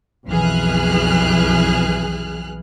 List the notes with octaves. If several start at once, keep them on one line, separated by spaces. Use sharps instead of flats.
B1 F2 E3 G#4 F6 F#6